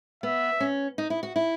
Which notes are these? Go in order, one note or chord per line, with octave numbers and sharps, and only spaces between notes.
B3 E5
C#4
D#4
E4
F#4
E4